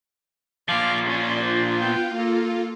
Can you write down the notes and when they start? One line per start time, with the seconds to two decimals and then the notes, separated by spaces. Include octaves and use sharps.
0.68 A#2 F3 F5 D6
1.07 C#4 F4 D5
1.41 D4 F4 C5
1.81 B3 G5
2.14 A#3 A4